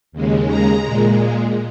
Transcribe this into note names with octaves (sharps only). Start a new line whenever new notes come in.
D#2 C#3 G#3
A#5
A#2 G#3